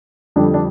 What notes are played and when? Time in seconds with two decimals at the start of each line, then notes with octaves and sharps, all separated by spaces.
0.36 F2 D3 G3 D4
0.54 D4